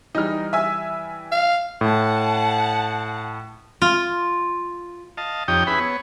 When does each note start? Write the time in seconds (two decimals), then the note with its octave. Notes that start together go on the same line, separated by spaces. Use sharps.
0.15 E3 G3 D#4 F6
0.53 E5 G#5 E6
1.32 F5
1.81 A2 F#5 A5
3.82 F4
5.17 D#5 F5 A5
5.48 F2 D#4 G4 C#5 G5 D#6
5.67 C#4 E4 G#4 B4 B5
5.80 B3 C#5